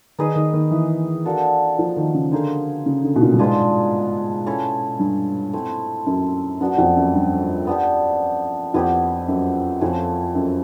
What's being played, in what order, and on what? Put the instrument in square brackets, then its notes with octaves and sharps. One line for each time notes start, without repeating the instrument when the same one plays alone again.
[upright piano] D#3 [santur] D#4 G#4 B4 D#5
[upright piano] D#3
D#3
E3
[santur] A#3 D4 F#4 A4
[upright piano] F3
D#3
C#3
[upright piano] D3 [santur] A#3 D#4 G#4 C5
[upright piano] C#3
D3
B2
A#2
G2
[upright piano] G#2 [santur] D4 F4 G#4 B4
[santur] C#4 E4 A4
[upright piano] G2
[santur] A3 C4 E4
[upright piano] F#2
[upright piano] F#2 [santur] B3 D4 F#4
[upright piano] F2
F#2
G2
[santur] B3 D4 G4
[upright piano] F2 [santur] B3 E4 G4 B4
[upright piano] F#2
[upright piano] F2 [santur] F3 A3 C#4 E4
[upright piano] F#2